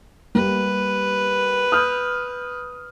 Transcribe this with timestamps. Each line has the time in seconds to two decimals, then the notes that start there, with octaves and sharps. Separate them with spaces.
0.35 G3 A#3 B4
1.72 D#6 F6 G6